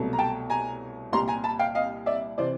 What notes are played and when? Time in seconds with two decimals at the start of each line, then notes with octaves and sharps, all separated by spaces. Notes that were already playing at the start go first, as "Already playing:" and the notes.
Already playing: C2 B2 F#3 A3
0.13 A#5
0.19 G5 A5
0.50 G#5 A#5
1.13 C2 A#2 G3 A#5 C6
1.28 G#5 A#5
1.44 A5 B5
1.59 F5 G5
1.75 D#5 F5
2.06 D5 E5
2.38 C3 E3 C5 D5